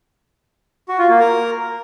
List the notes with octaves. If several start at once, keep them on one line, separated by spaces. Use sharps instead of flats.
F#4
F4
A#3
A#4